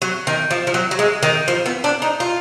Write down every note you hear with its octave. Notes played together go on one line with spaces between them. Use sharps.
F#3
D#3
F3
F3
F#3
F#3
G#3
D#3
F3
B3
D4
D#4
F4